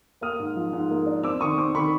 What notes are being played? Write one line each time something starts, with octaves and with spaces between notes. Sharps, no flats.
A#3 D#6 F6
G#2
F3
G#2
A#3
D4
C4 D6 E6
D#3 C#6 D#6
C4 C6 D6
D#3 B5 C#6